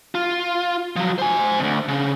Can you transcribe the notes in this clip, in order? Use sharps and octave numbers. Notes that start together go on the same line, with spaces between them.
F4
F3 F#3
C5 G#5
D2 B2
C#3